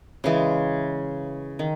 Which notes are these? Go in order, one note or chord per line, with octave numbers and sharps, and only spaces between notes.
C#3 E3 G#3
D#3